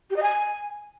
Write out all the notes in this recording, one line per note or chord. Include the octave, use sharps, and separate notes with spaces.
G4
D#5
G#5